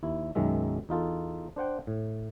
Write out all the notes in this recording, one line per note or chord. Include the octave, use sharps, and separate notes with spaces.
D#2 E4
B1 F#2 D#3 G#3 E5
E2 D#4 F4 A4
D4 C5 F#5 G5
A2